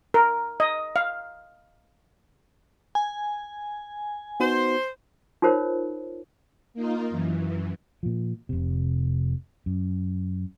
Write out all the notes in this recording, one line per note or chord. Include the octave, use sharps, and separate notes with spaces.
A#4
D#5
F5
G#5
B3 D#4 F#4 C5
D#4 F4 A#4 C5 C#5
A#3 D#4 F4
F#2 E3
A#2 F3
F1 C3
F#2